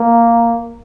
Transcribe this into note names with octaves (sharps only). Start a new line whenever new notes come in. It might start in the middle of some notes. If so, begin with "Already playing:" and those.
Already playing: A#3